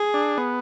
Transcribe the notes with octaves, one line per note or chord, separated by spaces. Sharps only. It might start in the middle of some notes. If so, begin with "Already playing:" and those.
Already playing: G#4
D4
B3